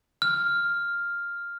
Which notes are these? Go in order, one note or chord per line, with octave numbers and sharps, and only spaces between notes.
F6